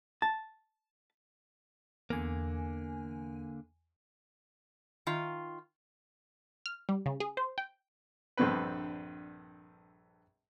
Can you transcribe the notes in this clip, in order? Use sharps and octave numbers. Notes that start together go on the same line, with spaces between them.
A5
E2 D3 A#3 G#5
D#3 F4
F6
G3
C#3
G#4
C5
G5
A#1 G2 D3 C4 B4